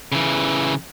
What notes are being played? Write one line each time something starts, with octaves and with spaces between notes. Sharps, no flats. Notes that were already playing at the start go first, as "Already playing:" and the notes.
C#3 E3